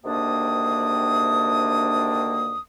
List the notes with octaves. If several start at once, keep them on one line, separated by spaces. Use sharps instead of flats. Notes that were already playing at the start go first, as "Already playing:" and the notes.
D2 C3 D#3 A#3 D4 D#6